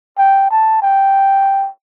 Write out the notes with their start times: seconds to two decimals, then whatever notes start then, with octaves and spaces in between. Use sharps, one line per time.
0.18 G5
0.51 A5
0.82 G5